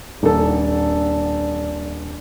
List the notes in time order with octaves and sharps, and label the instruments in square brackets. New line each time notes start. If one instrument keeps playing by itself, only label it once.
[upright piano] D#1 A4 [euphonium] D4